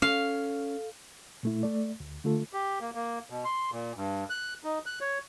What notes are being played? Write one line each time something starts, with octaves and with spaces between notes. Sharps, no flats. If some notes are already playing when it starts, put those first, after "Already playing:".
C#4 A4 F5
A#2 A3 E4
A3 D5
D2
D3 A3 F4 A4
G4
A#3
A#3
B2
C6
A#2
G2
F#6
D#4
F#6
C#5